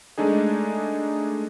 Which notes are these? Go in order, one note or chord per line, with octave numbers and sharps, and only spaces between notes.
G#3 A3 D4 D#4 G#4